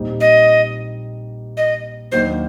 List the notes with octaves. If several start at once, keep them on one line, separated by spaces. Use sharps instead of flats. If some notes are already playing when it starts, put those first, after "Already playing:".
Already playing: A#1 A#2 G3 C4 D#4
D#5
D#5
D#2 D#3 F#3 A#3 D4 C5